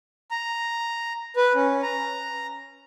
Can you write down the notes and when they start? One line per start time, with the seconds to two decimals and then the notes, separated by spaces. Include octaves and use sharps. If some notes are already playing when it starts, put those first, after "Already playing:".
0.31 A#5
1.36 B4
1.55 C#4
1.83 A#5